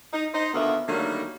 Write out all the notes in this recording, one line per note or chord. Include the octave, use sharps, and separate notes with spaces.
D#4
D#4 C5 D#5
D2 A#2 D#3 A#3 B3 E5
D3 D#3 F#3 G3 A3 A#3